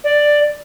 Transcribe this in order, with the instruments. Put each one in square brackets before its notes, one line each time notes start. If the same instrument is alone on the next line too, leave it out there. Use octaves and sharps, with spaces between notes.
[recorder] D5